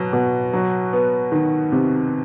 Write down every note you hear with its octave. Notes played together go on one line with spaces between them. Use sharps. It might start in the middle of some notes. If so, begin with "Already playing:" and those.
Already playing: B2 F#3
B2
F#3
B3
D#3
C3